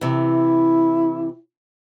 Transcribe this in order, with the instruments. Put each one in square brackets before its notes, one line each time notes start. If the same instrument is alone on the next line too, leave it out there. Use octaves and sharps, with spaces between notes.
[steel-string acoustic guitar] C3 E3 [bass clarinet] E4